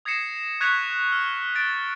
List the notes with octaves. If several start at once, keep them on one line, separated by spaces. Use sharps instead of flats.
D#6 G#6 A#6 C7 C#7 E7
C#6 F#6 G#6 B6 C#7 F7
F6
A6 D7